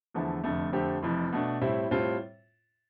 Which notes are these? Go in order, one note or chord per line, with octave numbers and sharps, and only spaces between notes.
E2 D3 F3 A3 E4
F1 F2 D3 A3
F2 D3 A3 C4 G4
F1 F2 E3
B2 A3 D4
A2 G3 C4 E4
A2 G3 C4 F4